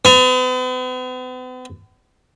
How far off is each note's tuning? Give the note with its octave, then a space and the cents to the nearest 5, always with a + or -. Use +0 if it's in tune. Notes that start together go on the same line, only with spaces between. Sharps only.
B3 +45